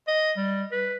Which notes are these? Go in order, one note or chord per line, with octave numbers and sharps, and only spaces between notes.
D#5
G3
B4